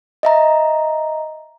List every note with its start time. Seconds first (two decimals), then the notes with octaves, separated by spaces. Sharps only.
0.23 D#5 E5 A#5